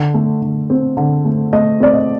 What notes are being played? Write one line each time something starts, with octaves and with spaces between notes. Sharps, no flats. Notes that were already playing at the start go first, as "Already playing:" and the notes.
Already playing: D3
A3
D3
C4
D3
A3
A3 D#5
C4 D5
D#5